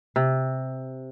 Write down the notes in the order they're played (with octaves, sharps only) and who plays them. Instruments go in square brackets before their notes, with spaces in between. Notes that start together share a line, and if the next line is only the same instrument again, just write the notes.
[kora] C3